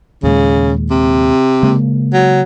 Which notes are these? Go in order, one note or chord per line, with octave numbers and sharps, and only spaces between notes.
D#2 A#2 C#3 G#3
C3
C#3 G#3 A#3
F#3